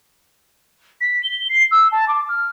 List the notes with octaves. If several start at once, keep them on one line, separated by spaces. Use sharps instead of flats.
B6
G7
C7
E6
A5
D6
F6